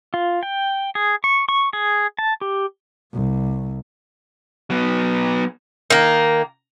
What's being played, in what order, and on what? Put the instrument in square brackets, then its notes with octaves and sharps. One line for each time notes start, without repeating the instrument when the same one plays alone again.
[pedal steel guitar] F4
G5
G#4
C#6
C#6
G#4
A5
G4
[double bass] C2
[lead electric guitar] F#3 B3
[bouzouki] D#3 A#3